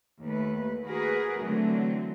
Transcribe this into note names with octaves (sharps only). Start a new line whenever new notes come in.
D#2 A3 B4
F#4 G#4 A#4 B4
D3 E3 F#3 A3 C4